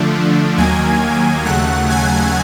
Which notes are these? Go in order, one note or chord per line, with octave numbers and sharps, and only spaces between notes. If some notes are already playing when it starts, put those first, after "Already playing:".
Already playing: D3 F3 A3 D4
D#2 D#3 F#3 A#3 G#5 G#6
D#2 C#3 F#3 A3 F#5 F#6
G#5 G#6